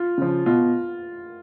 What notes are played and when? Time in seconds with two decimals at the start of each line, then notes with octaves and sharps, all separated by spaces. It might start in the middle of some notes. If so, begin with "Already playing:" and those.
Already playing: F4
0.18 C#3 F3
0.46 B2 F4